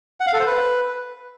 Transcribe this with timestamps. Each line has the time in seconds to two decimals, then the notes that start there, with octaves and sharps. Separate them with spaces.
0.20 F#5
0.27 F5
0.33 A4
0.40 C5
0.46 B4